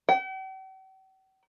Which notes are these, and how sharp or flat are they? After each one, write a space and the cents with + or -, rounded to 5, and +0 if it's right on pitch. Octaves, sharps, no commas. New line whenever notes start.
G5 -45